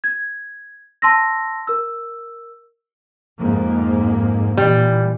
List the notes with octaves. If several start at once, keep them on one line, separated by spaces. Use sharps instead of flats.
G#6
A5 C6 E6 A#6
A#4 E6
F2 G#2 A#3
A#2 E3 G3